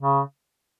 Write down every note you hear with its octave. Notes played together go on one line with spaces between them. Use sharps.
C#3